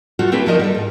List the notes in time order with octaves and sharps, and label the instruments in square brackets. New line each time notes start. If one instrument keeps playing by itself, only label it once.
[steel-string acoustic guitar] A3 F4 F#4 A4
C4 E4 G4 B4 C#5 A5
D2 F3 D#4 A#4 C5 D#5
G3 F#4 A4
G#2